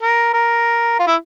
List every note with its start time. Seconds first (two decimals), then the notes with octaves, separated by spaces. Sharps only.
0.01 A#4
0.33 A#4
0.99 F4
1.07 E4